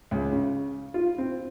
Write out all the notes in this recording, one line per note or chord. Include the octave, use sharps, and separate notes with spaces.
C#2
C#3
F4
C4